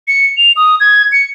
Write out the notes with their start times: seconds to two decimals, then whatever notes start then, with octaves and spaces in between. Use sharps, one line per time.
0.08 C#7
0.37 F7
0.56 D#6
0.80 G#6
1.12 C#7